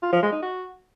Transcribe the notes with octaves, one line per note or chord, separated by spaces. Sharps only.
F4
F3
G#3
D#4
F#4